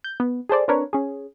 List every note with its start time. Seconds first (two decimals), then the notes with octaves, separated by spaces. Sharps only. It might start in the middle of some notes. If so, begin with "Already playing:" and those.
0.04 G6
0.20 B3
0.49 G#4 A4 C5 D5
0.68 C4 D4 A#4 B4 C#5
0.93 C#4 G#4